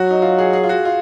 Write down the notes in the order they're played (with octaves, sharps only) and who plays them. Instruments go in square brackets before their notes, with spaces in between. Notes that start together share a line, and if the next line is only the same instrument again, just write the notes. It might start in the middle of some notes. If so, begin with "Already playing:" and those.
Already playing: [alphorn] F#3 [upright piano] F#4
[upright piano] D#4
F4
G#4
G#4
F4
F#4
F4